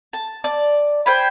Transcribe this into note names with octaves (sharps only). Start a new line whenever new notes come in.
A5
D5 A5
C5 G5 G#5 B5